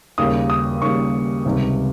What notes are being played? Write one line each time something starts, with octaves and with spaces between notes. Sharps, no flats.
D#2 C#3 G3 A#3 D#6
D#6
D#2 C#3 G3 A#3 C#6
C#2 C3 D#3 G3